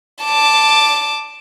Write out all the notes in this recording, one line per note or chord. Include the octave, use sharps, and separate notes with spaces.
A5 D6